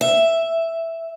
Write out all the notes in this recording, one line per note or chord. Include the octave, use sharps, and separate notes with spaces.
E5